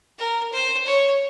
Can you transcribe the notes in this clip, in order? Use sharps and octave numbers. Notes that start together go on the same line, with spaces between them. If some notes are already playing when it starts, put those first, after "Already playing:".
A#4
C5
C#5